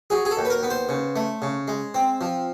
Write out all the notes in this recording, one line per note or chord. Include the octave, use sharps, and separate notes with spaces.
F#3 G#4
G#4
A4
D#2
B4
A#4
B3
C5
C#3
A3
C#3
G#3
C4
F3